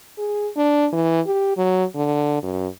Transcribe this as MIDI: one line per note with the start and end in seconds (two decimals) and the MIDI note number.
0.18 0.48 68
0.56 0.87 62
0.92 1.21 52
1.26 1.54 67
1.57 1.84 54
1.95 2.39 50
2.42 2.68 42